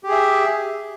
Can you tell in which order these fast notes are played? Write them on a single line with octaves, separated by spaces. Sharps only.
G4 G#4 E5